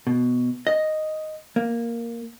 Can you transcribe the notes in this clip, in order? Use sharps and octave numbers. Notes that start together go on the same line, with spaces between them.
B2
D#5
A#3